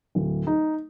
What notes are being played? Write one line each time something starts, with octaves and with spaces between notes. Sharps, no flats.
D1
D#4